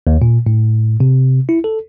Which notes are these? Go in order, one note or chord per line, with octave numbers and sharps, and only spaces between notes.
D#2
A#2
A2
C3
E4
A4